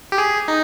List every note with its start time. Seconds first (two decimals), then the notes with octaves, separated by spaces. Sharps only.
0.12 G4
0.18 G#4
0.48 D#4